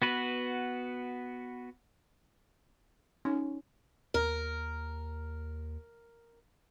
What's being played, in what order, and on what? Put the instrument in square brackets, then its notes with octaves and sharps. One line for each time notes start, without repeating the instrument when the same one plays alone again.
[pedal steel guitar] B3 F#4 B4
[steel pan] C#4 [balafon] D#4
[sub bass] D#2 [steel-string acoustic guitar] A#4